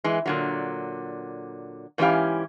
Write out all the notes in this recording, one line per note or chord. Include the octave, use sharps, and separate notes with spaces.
E3 G#3
A#2 D3 F#3
G#2 E3 C#4 E4 G4 F5